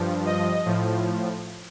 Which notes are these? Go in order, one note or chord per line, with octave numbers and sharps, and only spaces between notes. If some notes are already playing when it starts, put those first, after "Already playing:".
Already playing: G2 F3
D#5
A2 F3